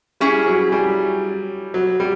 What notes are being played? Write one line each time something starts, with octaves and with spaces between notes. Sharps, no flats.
G3 C#4 E4 G#4
F#3
G3
F#3
G3